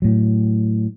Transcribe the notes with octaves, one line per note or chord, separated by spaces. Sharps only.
A2 F#3